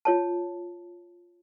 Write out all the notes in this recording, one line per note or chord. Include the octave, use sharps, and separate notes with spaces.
F4 C#5 A5